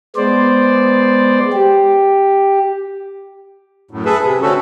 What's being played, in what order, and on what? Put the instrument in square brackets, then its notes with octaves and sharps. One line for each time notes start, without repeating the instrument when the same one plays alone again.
[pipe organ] G#3 B3 C5 D5
G4
[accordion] F#2 A2
G#4 A4 B4 E5
C3
D3 A3 C4 C#4 F#4 A4